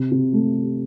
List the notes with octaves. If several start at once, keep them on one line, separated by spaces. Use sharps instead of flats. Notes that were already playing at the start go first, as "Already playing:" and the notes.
Already playing: C3
C3
A3